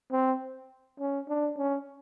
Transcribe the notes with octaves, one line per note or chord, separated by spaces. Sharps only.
C4
C#4
D4
C#4